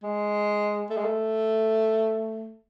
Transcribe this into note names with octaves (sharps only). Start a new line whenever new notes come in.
G#3
A3
G#3
A3